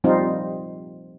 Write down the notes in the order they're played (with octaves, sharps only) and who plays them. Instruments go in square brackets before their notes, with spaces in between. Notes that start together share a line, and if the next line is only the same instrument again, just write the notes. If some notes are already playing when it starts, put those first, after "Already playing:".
[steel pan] F3 G3 C4 D#4 F4